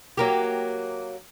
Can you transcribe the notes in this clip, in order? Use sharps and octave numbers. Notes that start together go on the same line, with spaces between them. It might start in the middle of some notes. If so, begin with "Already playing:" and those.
F#3 A#3 G4